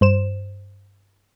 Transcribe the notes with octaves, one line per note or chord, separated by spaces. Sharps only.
G2 C5 E7